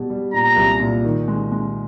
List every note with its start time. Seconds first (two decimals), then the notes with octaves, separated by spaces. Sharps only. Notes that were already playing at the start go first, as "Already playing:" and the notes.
Already playing: B2 G3
0.10 G3
0.33 A#2 A#5
0.56 C2
0.80 A#2
1.04 D#3
1.28 G#3
1.52 G#3